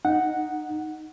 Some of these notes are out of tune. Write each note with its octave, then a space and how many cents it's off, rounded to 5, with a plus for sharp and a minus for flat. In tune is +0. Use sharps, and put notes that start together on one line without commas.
D#4 -5 F#5 +0